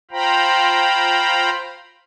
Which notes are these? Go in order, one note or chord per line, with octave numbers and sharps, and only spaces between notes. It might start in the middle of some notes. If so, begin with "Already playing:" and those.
F4 C5 F5 G5 A#5 B5